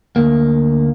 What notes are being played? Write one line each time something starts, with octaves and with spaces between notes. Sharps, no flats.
D2 A#3